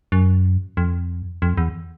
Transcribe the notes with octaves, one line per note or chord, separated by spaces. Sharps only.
F#2
F2
F2
E2